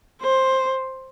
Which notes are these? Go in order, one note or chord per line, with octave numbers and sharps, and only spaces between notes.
C5